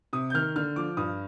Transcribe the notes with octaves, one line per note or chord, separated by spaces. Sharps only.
C3 D#6
G6
D#3 F6
D3 F6
F3 D6
G2 D#6